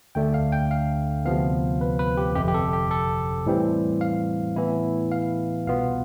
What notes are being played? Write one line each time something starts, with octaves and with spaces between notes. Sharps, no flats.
D2 D3 A3 D4 G5
F5
G5
F5
D2 C3 F3 B3 F5
B4
B4
G4
G1 F2 C3 G4
G4
A4
G4
A4
A2 E3 G3 C4
F5
A2 E3 B3 E4
F5
C2 B2 B3 F4 F5